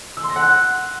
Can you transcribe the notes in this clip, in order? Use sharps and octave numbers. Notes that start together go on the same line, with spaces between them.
E6
C6
A#6
F#5
F#6